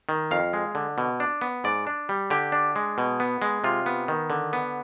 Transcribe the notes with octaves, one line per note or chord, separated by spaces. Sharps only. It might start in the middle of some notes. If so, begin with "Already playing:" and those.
D#3
F2 F5
G#3
D3
B2
D4
B3
G#2 D5
D4
G3
D3 G4
D4
G#3
B2
B3
G#3
C3 F4
B3
D#3
D3
B3